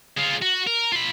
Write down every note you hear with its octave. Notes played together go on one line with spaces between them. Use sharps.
G#3 F4
F#4
A#4
F4 B5